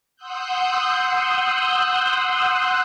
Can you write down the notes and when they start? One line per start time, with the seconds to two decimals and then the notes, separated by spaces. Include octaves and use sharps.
0.16 F#5 C6 D#6 E6 F#6 G6